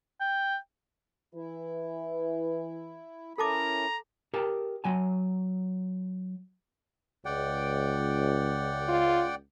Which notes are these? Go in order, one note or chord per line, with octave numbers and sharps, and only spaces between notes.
G5
E3 E4
C#4 E4 A4 A#4 A5 A#5 D6
G4 A#4 G5 A5
F#3 G#5 A5
C#2 D5 F#5 G5
F4